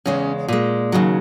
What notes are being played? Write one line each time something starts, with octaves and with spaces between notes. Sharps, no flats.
E2 C#3 G#3 C#4
A#2 G#3
D#2 C#3 F#3